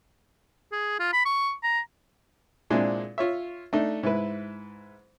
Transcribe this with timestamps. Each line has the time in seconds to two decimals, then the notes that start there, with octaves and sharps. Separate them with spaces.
0.72 G#4
1.00 F4
1.13 B5
1.25 C#6
1.63 A#5
2.70 A#2 G#3 C4 D4 E4
3.18 F4 C#5 E5
3.73 A3 D4 D#4
4.03 G#2 E4 B4